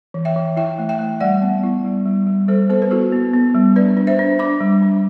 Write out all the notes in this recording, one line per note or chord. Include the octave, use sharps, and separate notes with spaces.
E3
E5 G5
E3
E4 E5 G5
A3
E5 G5
A3
G3 D5 F#5
B3
E4
G3
G3
G3
G3 A4 C5
B3 A4 C5
B4
E4 F#4 A4
B3
B3
G3
D4 B4 D5
D4
C5 E5
D4
D4 B5 D6
G3
D4